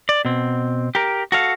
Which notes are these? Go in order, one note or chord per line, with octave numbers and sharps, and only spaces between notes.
D5
B2 C4
G4 A#4
F#4 A4 F5